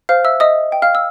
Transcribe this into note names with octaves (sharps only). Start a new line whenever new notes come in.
C5 F5 F6
E5 E6
D#5 E5 D#6
G5
F5 F6
E6